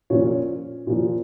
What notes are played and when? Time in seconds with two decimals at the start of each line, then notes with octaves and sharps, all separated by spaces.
0.10 A#2 F3 C#4 C#5
0.87 A#2 F3